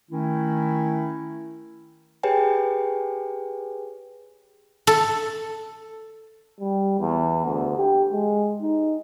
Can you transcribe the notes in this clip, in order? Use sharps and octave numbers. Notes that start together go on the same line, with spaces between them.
D#3 A3 C#4 E4
G4 G#4 B4 C#5 G5 G#5
A4
G3
E2
D2
G4
G#3
D#4